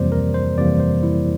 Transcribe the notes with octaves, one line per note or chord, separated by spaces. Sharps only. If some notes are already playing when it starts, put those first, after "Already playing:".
Already playing: F2 C3 E3 G3 A#3 C5 D5
A#4
C5
F2 C3 E3 G3 A#3 D5
C5
E4